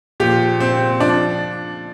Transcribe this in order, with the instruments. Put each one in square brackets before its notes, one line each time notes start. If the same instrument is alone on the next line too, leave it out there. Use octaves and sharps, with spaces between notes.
[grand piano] A#2 F3 G4
C4
F3 D4